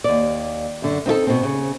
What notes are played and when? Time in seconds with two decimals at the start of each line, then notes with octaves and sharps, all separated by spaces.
0.04 D#2 D5
0.82 F#2 D3
1.06 C4 D#4 F4 A4
1.27 B2 C4
1.43 C#3